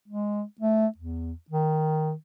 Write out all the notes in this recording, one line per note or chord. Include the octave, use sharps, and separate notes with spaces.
G#3
A3
E2
D#3